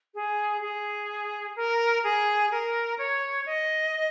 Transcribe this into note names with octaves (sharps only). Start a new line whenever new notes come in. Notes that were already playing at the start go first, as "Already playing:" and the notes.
G#4
G#4
A#4
G#4
A#4
C#5
D#5